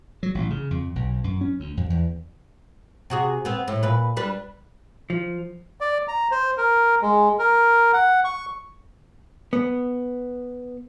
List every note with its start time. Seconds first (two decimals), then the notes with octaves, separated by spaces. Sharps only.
0.23 F#3
0.35 A1
0.50 C#3
0.71 F2
0.96 B1
1.24 F#2
1.41 C#4
1.60 D2
1.77 F2
1.90 E2
3.10 C3 F#4 G#4
3.45 B3 C4
3.68 A2
3.83 A#2 B4
4.17 G3 D4 B4
5.10 F3
5.80 D5
6.08 A#5
6.31 C5
6.57 A#4
7.02 G#3
7.39 A#4
7.93 F#5
8.25 C#6
9.53 B3